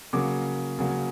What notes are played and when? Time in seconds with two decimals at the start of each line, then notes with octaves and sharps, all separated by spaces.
0.13 C#3 F#3 A#3 D6
0.79 C#3 F#3 A#3